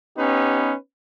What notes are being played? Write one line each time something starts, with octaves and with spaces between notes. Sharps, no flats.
B3 C#4 D#4 G4 B4